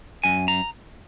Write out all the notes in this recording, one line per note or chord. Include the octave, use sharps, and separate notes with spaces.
F#2 G#5
A#5